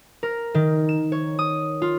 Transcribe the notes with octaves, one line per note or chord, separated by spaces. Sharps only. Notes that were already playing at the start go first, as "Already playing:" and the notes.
A#4
D#3
E7
C#5
D#6
F4